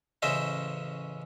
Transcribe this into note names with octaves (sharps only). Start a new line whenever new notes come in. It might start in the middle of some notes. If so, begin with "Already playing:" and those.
A1 C#3 C#4 C5 D#5 E5